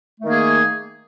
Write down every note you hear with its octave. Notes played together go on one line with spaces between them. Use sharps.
D#3 A3 A#3 G#4